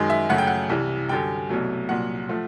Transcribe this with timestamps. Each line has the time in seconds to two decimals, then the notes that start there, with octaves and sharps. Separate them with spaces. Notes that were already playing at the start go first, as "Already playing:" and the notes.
Already playing: F#2 D#3 G#3
0.10 E5
0.29 F#2 C#3 F#3 A3 F#5
0.38 G5
0.47 F#5
0.69 C2 C3 E3
1.09 F#2 D3 G3 G5
1.49 C2 B2 F#3 A3
1.89 C2 A#2 F#3 F#5
2.29 F3 A3